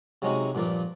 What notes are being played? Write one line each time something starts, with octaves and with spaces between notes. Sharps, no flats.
C3 F#3 G#3 C#4 D#4 F#4
G2 A#2 F3 A#3